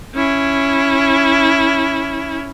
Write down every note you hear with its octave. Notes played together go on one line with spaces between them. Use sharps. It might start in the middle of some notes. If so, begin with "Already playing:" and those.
C#4 E4